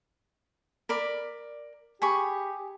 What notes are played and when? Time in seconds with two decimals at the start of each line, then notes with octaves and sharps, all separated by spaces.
0.89 A#4 D5 B5
2.02 G4 G#4 B5 C#6